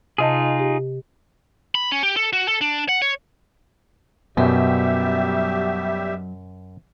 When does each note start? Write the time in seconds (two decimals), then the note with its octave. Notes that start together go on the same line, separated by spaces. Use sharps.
0.18 C3 D#4 F4 G#4 D#5 A5
0.59 G4
1.75 B5
1.92 C#4
2.03 G4
2.16 A4
2.33 F#4
2.48 A4
2.61 D4
2.89 F#5
3.02 C#5
4.37 F#2 B2 F#3 G3 G4 E5